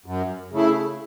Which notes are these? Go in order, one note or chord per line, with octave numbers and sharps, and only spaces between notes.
F#2
C#3 A3 E4